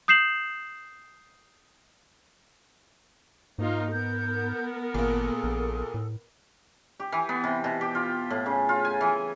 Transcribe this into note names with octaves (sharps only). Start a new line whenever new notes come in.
D#6 G6 C7 E7 F#7
G#2 A#3 D#4 F4
B3 A#4 G6
G#1 A#2 A#3 G#4 A4
A#1
A2
G4
E3
B3
C3
B2
G4
F4
A2
C#3
F4
G#5
E3